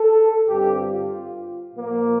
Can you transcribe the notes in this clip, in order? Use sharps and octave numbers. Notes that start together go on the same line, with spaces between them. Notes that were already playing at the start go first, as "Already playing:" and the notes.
Already playing: A4
G2 D3 G3 C4 G4
F4
A#2 F3 A#3